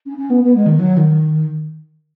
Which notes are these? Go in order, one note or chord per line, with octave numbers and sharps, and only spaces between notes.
C#4
C#4
B3
B3
G#3
D#3
F#3
D#3